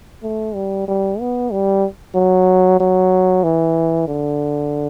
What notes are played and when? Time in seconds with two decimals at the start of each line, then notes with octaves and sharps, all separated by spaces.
0.23 A3
0.55 G3
0.88 G3
1.20 B3
1.52 G3
2.15 F#3
2.80 F#3
3.43 E3
4.08 D3